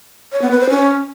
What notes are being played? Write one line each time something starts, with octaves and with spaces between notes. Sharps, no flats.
C#5
B3
B4
C5
C#4